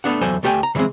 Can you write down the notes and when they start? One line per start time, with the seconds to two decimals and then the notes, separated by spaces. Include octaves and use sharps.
0.04 A3 B3 D4 F#5
0.21 E2 F#3 A4 C5 G#5
0.43 D2 A3 G4 B4 G5 G#5
0.63 A#5
0.75 C#3 E3 F#3 G#3 C4